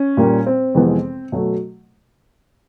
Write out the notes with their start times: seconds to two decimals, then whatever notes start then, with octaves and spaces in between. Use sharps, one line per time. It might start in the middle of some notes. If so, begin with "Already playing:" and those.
Already playing: C#4
0.17 A#2 G3 A#3
0.47 C4
0.75 F2 C3 E3 G#3 B3
1.32 B2 F#3 A3